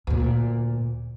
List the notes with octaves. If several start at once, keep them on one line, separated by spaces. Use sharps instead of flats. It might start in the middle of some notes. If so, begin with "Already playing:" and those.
D2 A#2